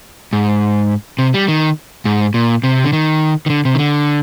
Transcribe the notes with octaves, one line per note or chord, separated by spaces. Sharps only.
G#2
C3
G3
D#3
G#2
A#2
C3
D3
D#3
D#3
D3
C3
D#3
D3